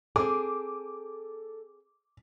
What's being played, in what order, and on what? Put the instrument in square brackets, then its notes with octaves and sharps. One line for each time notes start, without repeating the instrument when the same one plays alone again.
[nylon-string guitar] C4 G#4 [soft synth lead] A4 [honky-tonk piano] D6